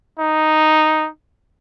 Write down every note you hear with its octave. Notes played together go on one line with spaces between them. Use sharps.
D#4